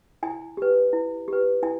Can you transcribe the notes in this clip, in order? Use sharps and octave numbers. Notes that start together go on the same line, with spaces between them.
E4 G#5
G4 B4
E4
G4 B4
E4 G#5